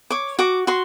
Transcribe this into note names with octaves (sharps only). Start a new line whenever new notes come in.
C#5 D6
F#4 D6
F#4 C6